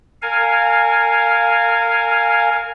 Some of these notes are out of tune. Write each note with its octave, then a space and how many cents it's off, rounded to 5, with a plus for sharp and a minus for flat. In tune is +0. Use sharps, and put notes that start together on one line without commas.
A#4 -30 F5 +0 G#5 +0